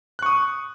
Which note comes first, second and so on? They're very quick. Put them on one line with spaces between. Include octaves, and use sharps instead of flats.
F#6 C#6 D#6